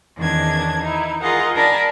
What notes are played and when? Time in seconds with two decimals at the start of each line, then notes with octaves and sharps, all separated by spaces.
0.17 E2 D#3 C#4 D4 G#6
0.83 D#4 E4
1.21 F4 G#4 A#4 D#5 F5 F#5
1.55 D4 A#4 G#5 A5 B5